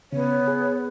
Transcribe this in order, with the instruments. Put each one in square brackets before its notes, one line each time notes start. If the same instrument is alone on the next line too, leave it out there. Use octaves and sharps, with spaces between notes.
[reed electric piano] C#3 [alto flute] B3 [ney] C#5
[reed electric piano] G#4